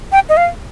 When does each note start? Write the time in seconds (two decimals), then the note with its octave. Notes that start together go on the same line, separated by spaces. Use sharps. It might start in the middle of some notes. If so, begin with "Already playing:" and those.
0.12 G5
0.29 D#5
0.37 F5